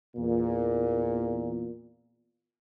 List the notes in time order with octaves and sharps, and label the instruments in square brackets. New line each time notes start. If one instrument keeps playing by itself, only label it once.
[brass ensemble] E2 A#2